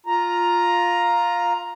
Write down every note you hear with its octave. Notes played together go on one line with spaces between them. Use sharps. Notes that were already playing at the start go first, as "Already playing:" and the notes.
F4 A#5